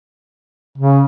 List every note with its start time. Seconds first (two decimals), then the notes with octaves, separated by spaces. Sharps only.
0.78 C#3